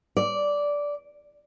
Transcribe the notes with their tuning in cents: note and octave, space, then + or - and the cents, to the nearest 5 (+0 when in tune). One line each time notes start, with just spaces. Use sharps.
D5 -10